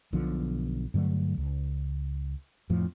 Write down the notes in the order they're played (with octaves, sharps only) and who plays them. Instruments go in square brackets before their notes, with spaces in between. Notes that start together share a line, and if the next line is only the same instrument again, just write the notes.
[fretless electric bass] B1 B2 D3 F3
G2 D3 F#3 A3
C#2
F2 A2 F3